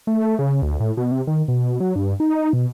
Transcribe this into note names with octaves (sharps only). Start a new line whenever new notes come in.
A3
C#3
D2
A2
B2
C3
D#3
B2
F#3
G2
D#4
B2